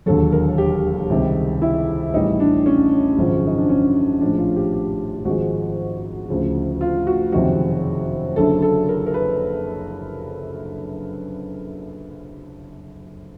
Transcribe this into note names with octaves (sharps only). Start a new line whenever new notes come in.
E1 D#2 D3 F#3 A4
A#4
G4
C#2 C3 D#3 G3
E4
A1 A2 E3 G3 D#4
D4
C#4
G#1 F#2 C#3 F3 G#3
D#4
D4
C#4
A#1 A2 F3 G#3 D4
F4
G4
G4
G#1 G#2 F3 G#3 F#4
D2 C#3 F3
F4
F#4
F#1 F2 C3 D#3 G#3 F#4
F#1 F#2 D3 A4
A4
A#4
A#4
B4